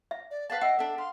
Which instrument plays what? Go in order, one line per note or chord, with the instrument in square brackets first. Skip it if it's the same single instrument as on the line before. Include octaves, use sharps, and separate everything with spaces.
[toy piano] E5
[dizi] D5
[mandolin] B4 F#5 A5 [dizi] F5
[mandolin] E4 [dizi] D#5 [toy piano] F#5
[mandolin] D4 E5 [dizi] A4
[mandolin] F5 [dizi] C6